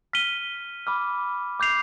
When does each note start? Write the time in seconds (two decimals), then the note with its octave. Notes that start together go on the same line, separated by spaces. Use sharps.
0.13 F6 B6 D#7 G7
0.87 B5 D6 F6
1.60 D6 G6 C7 F7